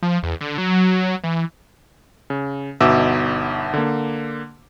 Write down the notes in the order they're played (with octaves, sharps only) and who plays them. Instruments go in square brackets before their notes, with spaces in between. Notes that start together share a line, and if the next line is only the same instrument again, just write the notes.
[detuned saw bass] F3
E2
D3
F#3
E3
[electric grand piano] C#3
G1 B2 D#4 E5 D6 E6
D3 A#3